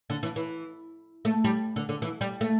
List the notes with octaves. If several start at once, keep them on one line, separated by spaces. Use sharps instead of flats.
D3
E3
E3
A3
G3
D3
D3
E3
G3
A3